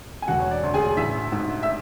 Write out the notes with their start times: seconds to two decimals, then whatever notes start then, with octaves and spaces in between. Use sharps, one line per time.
0.22 G#5
0.28 E1 F#4 F#5
0.40 C#5
0.51 D5
0.63 D2
0.74 G#4 G#5
0.97 A1 E4 E5
1.32 G#2
1.63 E5